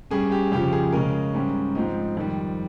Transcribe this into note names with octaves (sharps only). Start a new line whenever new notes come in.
G2 G3 C#4 G#4
G4
F2 C#3 F3 G4
G#4
C#3 G#3 C#4 A#4
G#2 G3 C#4
G#2 F3 C4 D#4
F2 D#3 G3